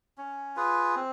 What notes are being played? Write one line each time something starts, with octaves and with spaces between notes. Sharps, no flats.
C#4
F4 G#4 B4
C4